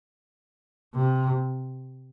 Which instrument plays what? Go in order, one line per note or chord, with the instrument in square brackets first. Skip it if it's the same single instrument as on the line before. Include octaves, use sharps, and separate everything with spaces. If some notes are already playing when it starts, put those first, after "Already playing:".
[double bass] C3